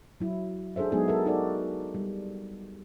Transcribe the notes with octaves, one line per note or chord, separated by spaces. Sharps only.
F#3 E4
D4 G#4 A4 C5 E5
F#3 G#3 B3 D#4 G#4
A4 A#4 E5
D#4 F#4 A4 A#4 D5
G3